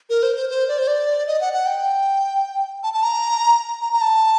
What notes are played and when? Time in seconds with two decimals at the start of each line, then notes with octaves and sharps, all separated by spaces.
0.10 A#4
0.23 C5
0.36 C5
0.50 C5
0.68 D5
0.79 C5
0.88 D5
1.27 D#5
1.41 F#5
1.53 F#5
1.66 G5
2.83 A5
2.94 A5
3.03 A#5
3.81 A#5
3.93 A#5
4.01 A5